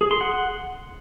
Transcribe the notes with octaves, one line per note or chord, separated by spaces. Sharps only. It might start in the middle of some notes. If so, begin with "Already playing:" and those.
G#4
C6
F#5